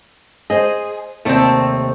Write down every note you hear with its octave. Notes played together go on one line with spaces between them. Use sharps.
G#4 C5 D#5
D#2 C3 A3 C4 D5